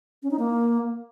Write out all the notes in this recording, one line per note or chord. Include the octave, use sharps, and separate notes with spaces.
C#4
D#4
A#3